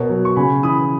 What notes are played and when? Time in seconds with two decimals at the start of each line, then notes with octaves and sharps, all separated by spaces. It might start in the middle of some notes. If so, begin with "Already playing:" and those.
Already playing: B2 A#4 C#5
0.09 F#3
0.25 C#6
0.36 C#3 G#5 B5
0.63 E3 B5 D#6